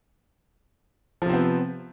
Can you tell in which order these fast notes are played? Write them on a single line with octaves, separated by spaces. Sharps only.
F3 C3 C4 B3